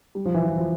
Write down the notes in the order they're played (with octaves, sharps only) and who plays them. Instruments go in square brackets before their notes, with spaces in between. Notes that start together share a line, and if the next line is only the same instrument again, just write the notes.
[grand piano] G3
F3
E3
F3
F3